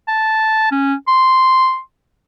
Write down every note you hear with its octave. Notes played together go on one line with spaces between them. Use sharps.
A5
C#4
C6